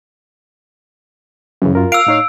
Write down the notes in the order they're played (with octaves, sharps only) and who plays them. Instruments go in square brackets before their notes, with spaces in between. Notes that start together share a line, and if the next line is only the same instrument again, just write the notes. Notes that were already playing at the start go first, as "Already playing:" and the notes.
[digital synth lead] F#2 [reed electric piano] C#3 E3 F#3
[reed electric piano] F4 A#4
[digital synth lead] F5 [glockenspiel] E6 D7
[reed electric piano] A2 D#4 C#5